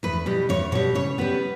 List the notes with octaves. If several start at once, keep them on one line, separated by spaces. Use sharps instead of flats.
E2 B4
B2 G3
E2 C#5
B2 G3 C#5
C#3 C#5
G3 B3 B4